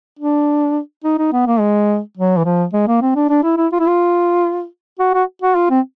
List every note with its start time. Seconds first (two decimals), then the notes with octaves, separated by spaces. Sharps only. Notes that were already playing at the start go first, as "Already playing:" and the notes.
0.19 D4
1.04 D#4
1.18 D#4
1.32 B3
1.47 A#3
1.60 G#3
2.17 F#3
2.37 E3
2.45 F3
2.73 G#3
2.87 A#3
3.01 C4
3.15 D4
3.29 D4
3.43 E4
3.57 E4
3.72 F4
3.80 E4
3.87 F4
4.99 F#4
5.14 F#4
5.42 F#4
5.55 F4
5.70 C4